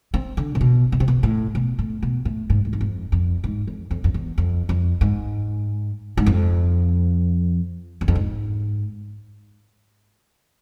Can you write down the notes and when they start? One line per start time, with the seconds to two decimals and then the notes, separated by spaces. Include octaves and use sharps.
0.14 C4
0.37 D3
0.55 C3
0.61 B2
0.92 B2
1.00 C3
1.08 B2
1.23 A2
1.55 B2
1.79 A2
2.03 B2
2.25 A2
2.50 G#2
2.65 A2
2.73 G#2
2.81 F2
3.12 F2
3.44 G#2
3.67 F2
3.91 F2
4.04 F2
4.14 E2
4.38 F2
4.69 F2
5.01 G#2
6.17 G#2
6.26 F2
8.01 E2
8.08 F2
8.15 G#2